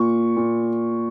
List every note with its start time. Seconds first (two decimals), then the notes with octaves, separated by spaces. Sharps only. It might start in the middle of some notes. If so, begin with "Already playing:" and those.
Already playing: A#2 C#6
0.37 A#2